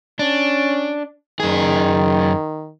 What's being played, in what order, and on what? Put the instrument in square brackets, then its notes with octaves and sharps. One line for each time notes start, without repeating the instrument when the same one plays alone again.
[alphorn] C#4 [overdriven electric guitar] D4
[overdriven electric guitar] F#2 G#4 [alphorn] D#3